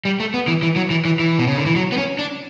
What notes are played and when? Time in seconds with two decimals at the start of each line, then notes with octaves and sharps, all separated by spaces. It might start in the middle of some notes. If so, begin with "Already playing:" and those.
0.05 G3
0.20 A3
0.34 B3
0.48 E3
0.63 E3
0.76 F#3
0.90 E3
1.05 E3
1.19 E3
1.39 B2
1.47 C#3
1.58 D3
1.66 E3
1.76 F#3
1.92 B3
1.97 C#4
2.19 D4